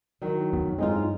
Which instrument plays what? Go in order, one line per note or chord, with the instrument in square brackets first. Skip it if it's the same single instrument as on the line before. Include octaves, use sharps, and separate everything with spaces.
[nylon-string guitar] D#3 F#3
[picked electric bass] F2 B3
[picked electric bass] G2 F#3 C4 [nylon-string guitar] G#3 D#4 F4